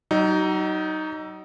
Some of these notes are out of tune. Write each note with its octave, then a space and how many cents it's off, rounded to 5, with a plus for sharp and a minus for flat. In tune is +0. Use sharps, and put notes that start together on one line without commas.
F#3 +40 D#4 +0